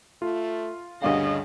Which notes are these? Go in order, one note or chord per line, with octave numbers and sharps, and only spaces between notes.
A3 F4
D2 G2 C#3 D#5 F5